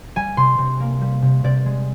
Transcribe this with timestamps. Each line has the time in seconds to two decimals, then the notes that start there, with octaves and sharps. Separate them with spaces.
0.16 G3 G#5
0.37 C3 C6
0.58 C3
0.80 A#3
1.01 G3
1.22 C3
1.44 C3 D5
1.66 G#3